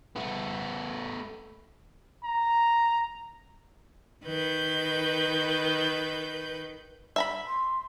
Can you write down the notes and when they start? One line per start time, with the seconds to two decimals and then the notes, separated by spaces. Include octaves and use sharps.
0.16 A3 B3
2.24 A#5
4.24 D#3 B4 G6
7.16 E5 A#5 B5
7.47 C6